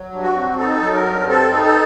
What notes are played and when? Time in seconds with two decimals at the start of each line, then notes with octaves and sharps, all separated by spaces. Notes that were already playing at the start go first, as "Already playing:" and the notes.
Already playing: F#3
0.12 G2
0.23 F#4
0.35 C4
0.58 D#4 A4
0.82 F#3
0.94 A#4
1.05 G2
1.28 C4 A4
1.52 D#4
1.64 A4